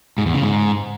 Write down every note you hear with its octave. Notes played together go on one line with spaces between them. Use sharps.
G#2
E2
C#3
G#2